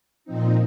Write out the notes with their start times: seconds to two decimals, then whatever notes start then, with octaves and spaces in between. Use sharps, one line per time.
0.25 A#2 F3 C4 D#4